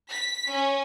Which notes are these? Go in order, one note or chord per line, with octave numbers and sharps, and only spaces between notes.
B6
C#4